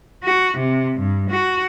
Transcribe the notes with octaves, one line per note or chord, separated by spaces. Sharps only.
F#4
C3
G2
F#4